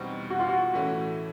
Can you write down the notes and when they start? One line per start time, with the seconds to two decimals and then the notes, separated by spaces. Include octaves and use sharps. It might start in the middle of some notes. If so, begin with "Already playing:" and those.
Already playing: E2 B2 G3 C4 D#4
0.30 F#4
0.40 F4
0.49 F#4
0.73 A2 E3 A3 C#4